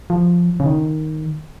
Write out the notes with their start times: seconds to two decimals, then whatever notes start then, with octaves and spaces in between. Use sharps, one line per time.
0.10 F3
0.60 C#3
0.66 D#3